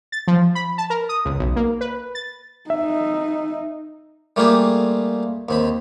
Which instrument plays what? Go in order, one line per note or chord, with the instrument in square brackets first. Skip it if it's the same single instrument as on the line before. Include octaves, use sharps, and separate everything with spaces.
[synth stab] A6
F3
B5
A5
A#4
D#6
C#2
B1
A#3
B4
A6
[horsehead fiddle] D#4 [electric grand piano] E5
[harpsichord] G3 A3 A#3 F4 G4 G#4
D#2 C4 B5